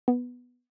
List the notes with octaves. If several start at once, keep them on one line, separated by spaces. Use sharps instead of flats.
B3